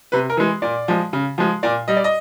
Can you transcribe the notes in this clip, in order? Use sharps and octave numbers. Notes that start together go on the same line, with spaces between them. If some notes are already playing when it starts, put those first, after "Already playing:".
C3 B4
A#4
E3 G#3
A#2 D5
F3 G#3
C#3
F3 G#3
A#2 D5
G3 D#5
D5
D#5